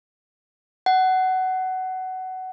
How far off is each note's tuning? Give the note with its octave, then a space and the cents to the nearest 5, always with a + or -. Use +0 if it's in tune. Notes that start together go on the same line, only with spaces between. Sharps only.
F#5 +15